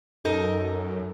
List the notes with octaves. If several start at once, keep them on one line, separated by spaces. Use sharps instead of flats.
F#2 D#4 A4 A#4